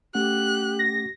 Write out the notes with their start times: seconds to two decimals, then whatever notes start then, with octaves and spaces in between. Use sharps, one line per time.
0.15 A3 C#4 G4 F#5 F#6
0.79 A#6